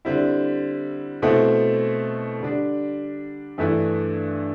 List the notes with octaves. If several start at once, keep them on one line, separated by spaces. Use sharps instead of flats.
D3 G3 C4 E4
B2 A3 C4 E4
D3 G3 D4
G2 E3 A3 E4